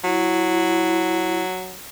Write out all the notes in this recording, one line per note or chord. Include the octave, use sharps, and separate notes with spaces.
F#3 E4